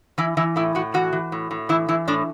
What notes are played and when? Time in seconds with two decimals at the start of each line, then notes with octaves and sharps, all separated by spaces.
0.18 E3 E4
0.37 E3 E4
0.56 A2 E4
0.75 A2 F#4
0.94 E3 F#4
1.13 E3
1.32 A2
1.51 A2
1.69 E3 E4
1.88 E3 E4
2.08 A2 D4